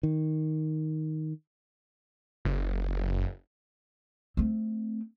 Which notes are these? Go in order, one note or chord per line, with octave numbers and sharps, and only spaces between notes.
D#3
F#1
A3 C4